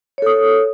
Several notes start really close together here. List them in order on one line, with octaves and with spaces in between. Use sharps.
C#5 A4 D#6